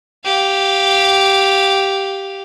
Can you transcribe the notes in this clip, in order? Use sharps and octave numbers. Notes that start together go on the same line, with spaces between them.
G4 F5